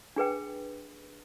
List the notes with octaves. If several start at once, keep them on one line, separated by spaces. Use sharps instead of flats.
D4 G#4 B4 G5